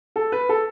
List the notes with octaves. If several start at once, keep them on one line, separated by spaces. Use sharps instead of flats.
A4
B4
A4